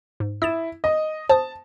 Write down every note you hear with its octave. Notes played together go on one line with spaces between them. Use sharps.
G#2
E4 D#6 A6 E7
D#5
C5 A5 D#6